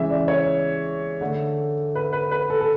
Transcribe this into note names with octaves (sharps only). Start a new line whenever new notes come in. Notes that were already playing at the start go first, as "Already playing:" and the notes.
Already playing: C#3 E3 G#3 E5
D5
C#5
D3 A3
B4
B4
B4
A4
A4